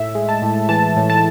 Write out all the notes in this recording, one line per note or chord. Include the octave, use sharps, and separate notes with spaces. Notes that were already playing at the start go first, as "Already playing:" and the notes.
Already playing: A2 E5
G#3
A5
A2
E3 A5
A2
A5